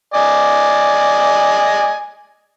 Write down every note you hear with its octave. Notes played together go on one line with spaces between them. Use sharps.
D5 D#5 G#5